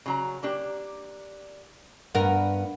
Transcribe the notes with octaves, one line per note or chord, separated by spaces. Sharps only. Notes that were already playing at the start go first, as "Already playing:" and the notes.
C#3 F#3 A#5
A#3 D4 G4
G2 B3 A#4 F#5